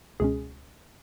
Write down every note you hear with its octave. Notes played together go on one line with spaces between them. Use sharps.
C#2 B2 G#3 C#4 G#4